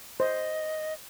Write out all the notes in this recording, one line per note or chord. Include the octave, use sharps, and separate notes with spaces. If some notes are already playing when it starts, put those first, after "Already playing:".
C5 D#5